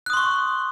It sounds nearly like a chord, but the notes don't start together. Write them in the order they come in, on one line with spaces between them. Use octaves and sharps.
F#6 D#6 C6 C#6